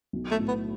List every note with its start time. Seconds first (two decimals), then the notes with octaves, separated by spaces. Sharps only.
0.13 B1
0.31 A3
0.39 A2 F#3
0.48 B3